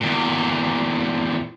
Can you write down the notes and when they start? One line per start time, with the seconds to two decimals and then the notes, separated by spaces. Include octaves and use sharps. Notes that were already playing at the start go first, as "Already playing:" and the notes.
0.01 E2 A#2